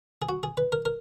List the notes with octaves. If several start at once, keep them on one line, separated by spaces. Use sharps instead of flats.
G#4
F#4
G#4
B4
A#4
A#4